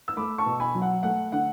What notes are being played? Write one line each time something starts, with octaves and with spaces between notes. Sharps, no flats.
E6
A3 B5 D6
A5 C#6
B2
G#5 B5
F#3
F#5
A3 F#5
D3 F#5